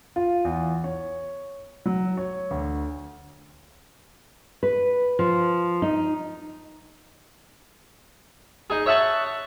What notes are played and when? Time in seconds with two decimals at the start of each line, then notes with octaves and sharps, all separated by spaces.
0.16 F4
0.45 E2
0.84 C#5
1.86 F#3
2.17 C#5
2.51 D2
4.63 B4
5.19 F3
5.82 D#4
8.70 D#4 G#4
8.86 C#5 E5 F#5 A5 C#6